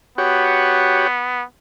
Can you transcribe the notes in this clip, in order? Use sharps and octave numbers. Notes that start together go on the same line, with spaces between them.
B3 F#4 G4 C#5